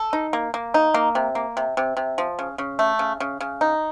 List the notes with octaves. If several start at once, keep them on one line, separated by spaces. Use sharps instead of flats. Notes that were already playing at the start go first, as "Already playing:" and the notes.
Already playing: A4
D#4
A#3
A#3
D#4
A#3
C3
A#3
C3
C3
C3
F3
C#3
C#3
A3
C#3
C#3
C#3
D#4